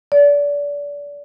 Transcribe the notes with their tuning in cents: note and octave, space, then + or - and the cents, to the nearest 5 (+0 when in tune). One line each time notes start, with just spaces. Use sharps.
D5 -30